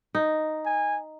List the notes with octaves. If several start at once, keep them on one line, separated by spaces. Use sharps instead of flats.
D#4
G#5